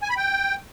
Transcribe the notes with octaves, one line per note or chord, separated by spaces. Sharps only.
G#5
B5
G5